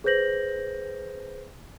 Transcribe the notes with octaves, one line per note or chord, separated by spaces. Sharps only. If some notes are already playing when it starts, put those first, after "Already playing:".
G#4 B4 C5 G6 A#6 F#7